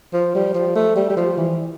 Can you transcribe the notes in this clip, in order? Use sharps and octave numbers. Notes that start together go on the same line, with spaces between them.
F3
G3
F3
A3
G3
G3
F3
E3